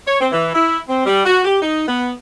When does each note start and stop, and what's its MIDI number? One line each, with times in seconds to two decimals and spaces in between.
0.07 0.17 73
0.20 0.28 60
0.32 0.53 52
0.55 0.80 64
0.89 1.04 60
1.06 1.23 55
1.26 1.42 66
1.45 1.62 67
1.62 1.88 63
1.88 2.10 59